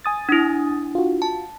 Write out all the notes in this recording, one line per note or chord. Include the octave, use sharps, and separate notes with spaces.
G#5 D#6 A6
D4 E4
F4 F#4
A5